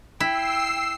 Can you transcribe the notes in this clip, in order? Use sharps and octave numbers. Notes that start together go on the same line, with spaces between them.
E4 G5 E6 C7